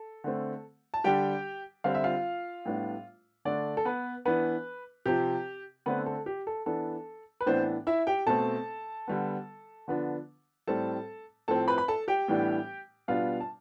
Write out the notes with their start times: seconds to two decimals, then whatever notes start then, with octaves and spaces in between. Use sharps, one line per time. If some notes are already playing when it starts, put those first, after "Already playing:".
Already playing: A4
0.24 D3 A3 C4
0.94 A5
1.04 D3 G3 D4 G4 G5
1.84 D3 G3 C4 F5
1.95 E5
2.04 F4 F5
2.65 A2 G3 B3 D4
3.45 D3 A3 D4 D5
3.77 A4
3.85 B3 B4
4.25 E3 B3 D4 B4
5.06 C3 F3 C4 G4
5.86 D3 A3 B3 C4 B4
6.06 A4
6.26 G4
6.47 A4
6.66 E3 B3 D4 A4
7.41 B4
7.46 A2 E3 B3 C4 D4 C5
7.87 E4 E5
8.07 G4 G5
8.27 B2 A3 C4 A4 A5
9.08 D3 G3 B3
9.88 D3 F3 B3 D4
10.68 A2 G3 C4 A4 A5
11.48 A2 F3 C4 A4 A5
11.68 B4 B5
11.78 B5
11.88 A4 A5
12.08 G4 G5
12.28 A2 E3 G3 B3 D4
13.08 B2 G3 B3 D4 F4 F5
13.40 A5